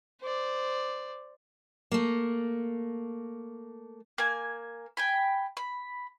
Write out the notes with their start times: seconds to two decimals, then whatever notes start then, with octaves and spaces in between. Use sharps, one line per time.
0.21 C5 D5
1.91 A3 A#3
4.18 A#3 G#5
4.97 G5 G#5 B5
5.57 B5